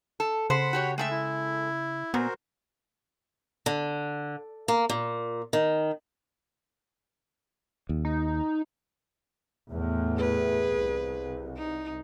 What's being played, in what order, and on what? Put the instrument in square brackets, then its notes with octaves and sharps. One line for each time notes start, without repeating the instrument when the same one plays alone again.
[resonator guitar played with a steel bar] A4
[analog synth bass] C#3 [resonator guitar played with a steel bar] C5 [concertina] F#5 B5
[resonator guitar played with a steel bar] F#4 G4 C#5
[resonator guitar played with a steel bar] G#3 A4 E5 [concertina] A3 G5
[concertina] E4
[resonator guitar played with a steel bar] A#2 [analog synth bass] B3 [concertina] F#4 A#4 C5
[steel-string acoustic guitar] D3
A#3
A#2
D#3
[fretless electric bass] D#2
[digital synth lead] D#4
[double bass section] E2 A2
[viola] G#4 B4
[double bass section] C2
[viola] D#4